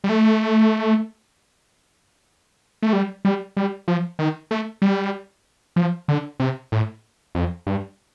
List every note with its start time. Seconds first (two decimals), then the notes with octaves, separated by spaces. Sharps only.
0.04 G3
0.09 A3
2.83 A3
2.93 G3
3.25 G3
3.57 G3
3.88 F3
4.19 D#3
4.51 A3
4.82 G3
5.76 F3
6.08 D3
6.40 C3
6.72 A2
7.35 F2
7.67 G2